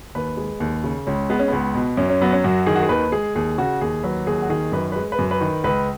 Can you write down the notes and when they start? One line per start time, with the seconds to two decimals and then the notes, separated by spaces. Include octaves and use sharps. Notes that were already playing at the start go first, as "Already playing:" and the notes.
0.15 D#2 B4
0.37 G#3
0.60 D#2
0.84 C#3
1.07 C#2 C#4
1.30 G#3 B3
1.39 C#4
1.48 C#2 B3
1.75 B2
1.97 F#2 C#4
2.09 C#4
2.21 F#3 B3
2.32 C#4
2.44 F#2 F#4
2.66 D#3 G#4
2.75 F#4
2.83 G#4
2.89 D#2 B4
3.12 G#3 G#4
3.35 D#2 G#4
3.58 C#3 F#4
3.81 D#2 G#4
4.04 F#3 B4
4.27 D#2 G#4
4.42 F#4
4.49 D#3 G#4
4.72 F#2 B4
4.92 G#3 B4
5.12 B4
5.19 F#2
5.31 B4
5.41 D#3
5.64 C#2 B4